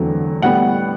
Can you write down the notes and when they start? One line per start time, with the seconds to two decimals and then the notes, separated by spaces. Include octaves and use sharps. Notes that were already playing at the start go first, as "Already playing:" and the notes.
Already playing: E2 D3 F#3 A3 C4
0.42 A2 G3 B3 F#5